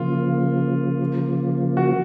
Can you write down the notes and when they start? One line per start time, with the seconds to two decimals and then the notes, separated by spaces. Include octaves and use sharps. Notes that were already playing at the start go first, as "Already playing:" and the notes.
Already playing: C#3 F3 A#3 F4
1.77 F#4